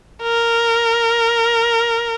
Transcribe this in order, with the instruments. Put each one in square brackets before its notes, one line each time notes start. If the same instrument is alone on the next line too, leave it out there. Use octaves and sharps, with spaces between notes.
[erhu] A#4